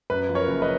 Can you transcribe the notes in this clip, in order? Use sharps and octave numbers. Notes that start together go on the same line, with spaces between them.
F#2 B4
F3
A#4 C#5
F#1
B4 D#5